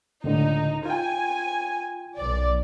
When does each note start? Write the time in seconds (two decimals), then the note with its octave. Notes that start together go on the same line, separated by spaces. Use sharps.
0.24 C#2 A2 D3 D#4
0.86 F4 G5 G#5
2.17 B1 D5